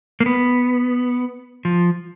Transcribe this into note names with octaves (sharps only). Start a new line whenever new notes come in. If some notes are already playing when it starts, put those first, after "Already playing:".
A#3
B3
F3